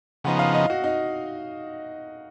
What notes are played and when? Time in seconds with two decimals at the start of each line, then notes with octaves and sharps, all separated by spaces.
0.24 C#3 F3 B3 D#4 F#5
0.39 F5
0.55 D#5
0.70 F#4
0.84 D#4